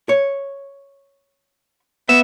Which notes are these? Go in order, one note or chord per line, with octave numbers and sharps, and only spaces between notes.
C#5
B3 E5